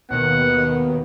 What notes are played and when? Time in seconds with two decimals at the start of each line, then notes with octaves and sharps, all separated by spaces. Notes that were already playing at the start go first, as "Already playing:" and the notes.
0.10 D#2 B2 D#3 B3 F#5